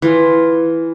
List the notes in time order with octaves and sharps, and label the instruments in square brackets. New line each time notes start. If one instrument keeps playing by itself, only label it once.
[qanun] E3 F4